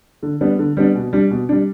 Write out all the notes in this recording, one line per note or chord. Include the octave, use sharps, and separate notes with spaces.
D3
G3 B3 D4
D3
G3 B3 D4
B2
G3 D4
B2
G3 D4